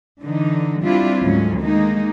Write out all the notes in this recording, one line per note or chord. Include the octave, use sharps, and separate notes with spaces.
D3 E3 D#4
G3 C4 D4 E4 F4
D2 G#2 F#3 C#4
D#3 G#3 A#3 D#4